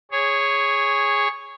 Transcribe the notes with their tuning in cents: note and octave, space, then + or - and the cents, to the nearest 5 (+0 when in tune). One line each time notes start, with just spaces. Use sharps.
G#4 -10 C#5 +0